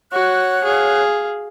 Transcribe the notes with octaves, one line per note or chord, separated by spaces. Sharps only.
F#4 C#5 F#5 F#6
G#4 F5